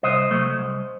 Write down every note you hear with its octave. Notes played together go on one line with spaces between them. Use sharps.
C2 C5 D#5
C3 F#3 A3
C2